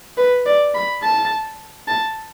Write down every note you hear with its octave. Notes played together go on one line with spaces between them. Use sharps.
B4
D5
B5
A5
A5